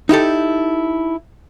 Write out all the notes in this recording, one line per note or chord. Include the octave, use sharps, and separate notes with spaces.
D#4 E4 G4 A4